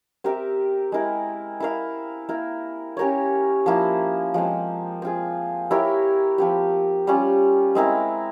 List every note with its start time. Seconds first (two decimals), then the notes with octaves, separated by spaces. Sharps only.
0.24 C4 G4 A#4 E5
0.92 G#3 E4 A#4
1.60 E4 A#4 F5
2.29 A#3 E4 A#4
2.97 C#4 G4 A#4 C#5
3.66 F3 A#3 E4
4.34 F3 G#3 C4
5.02 C4 F4 G#4
5.71 E4 G4 A#4 C#5
6.38 F3 C4 G4
7.07 G3 C#4 F4
7.75 G#3 C4 E4 A#4